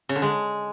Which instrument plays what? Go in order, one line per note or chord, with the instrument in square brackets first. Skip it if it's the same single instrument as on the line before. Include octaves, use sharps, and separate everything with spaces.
[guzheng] C#3
D3
G#3